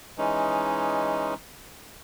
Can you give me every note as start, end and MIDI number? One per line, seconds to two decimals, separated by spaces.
0.18 1.34 52
0.18 1.34 56
0.18 1.34 61
0.18 1.34 63